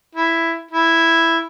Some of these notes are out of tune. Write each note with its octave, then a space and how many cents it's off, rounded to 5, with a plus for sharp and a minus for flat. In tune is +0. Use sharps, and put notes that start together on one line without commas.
E4 +5
E4 +0